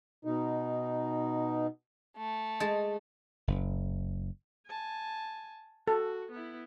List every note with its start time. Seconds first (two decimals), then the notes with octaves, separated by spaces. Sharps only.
0.25 B2 D#4
2.17 A3
2.60 G#3 A5
3.47 F#1
4.67 G#5 A5
5.88 F#4 A4
6.31 B3 E4